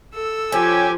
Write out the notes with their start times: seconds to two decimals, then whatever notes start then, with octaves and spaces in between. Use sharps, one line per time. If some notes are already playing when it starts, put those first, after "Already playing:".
0.15 A4 E6
0.52 F3 C#4 G4 G#5